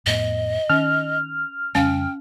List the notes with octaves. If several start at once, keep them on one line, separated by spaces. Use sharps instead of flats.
F2 A2 B3 D#5
D#3 C#4 F6
F2 C#3 G3 C#4 F5 G5